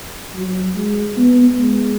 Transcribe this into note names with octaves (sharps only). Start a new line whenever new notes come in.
F#3
G#3
B3
G#3